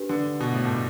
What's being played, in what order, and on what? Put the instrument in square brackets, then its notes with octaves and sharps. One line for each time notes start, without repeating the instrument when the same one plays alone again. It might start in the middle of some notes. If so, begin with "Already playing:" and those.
Already playing: [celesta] D4 G4 B4
[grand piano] D3
B2
A2
G2